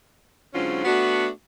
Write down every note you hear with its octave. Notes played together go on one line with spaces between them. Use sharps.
G#2 D3 F#3 C4 C#4 F4
A3 B3 D4 F#4